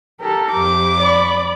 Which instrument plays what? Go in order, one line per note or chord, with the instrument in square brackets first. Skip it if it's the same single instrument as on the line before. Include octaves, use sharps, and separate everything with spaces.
[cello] G4 [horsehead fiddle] A4 A#4
[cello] F2 [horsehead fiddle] G4 [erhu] D6
[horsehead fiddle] D5 B5